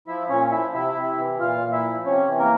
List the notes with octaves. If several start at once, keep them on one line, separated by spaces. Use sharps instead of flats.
F3 E4 E5
A#2 C#4 C#5
F3 E4 E5
C3 E4 E5
C3
E3
A#2 F4 F5
A#2
E4 E5
F3
C3 C#4 C#5
E3
A#3 A#4